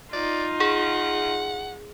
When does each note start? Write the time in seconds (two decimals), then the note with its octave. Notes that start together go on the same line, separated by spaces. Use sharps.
0.13 D#4 F4 D5
0.60 G#4 F#5